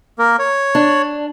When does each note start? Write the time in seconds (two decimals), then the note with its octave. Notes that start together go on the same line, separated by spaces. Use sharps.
0.19 A#3 A#4
0.39 C#5
0.75 D4